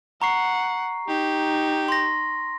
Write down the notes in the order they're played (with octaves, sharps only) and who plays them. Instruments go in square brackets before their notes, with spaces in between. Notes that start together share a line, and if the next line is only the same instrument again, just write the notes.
[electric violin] F#5 [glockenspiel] A#5 C#6 C7
[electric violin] D#4 [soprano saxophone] G4
[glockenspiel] C6 A#6